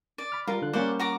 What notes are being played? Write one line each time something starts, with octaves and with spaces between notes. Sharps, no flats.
D5
B5 F6
G3 F4 A#4 B4
D3 F#6
G3 A#3 C#4 C5 D5 F#5
F#4 A#5 D6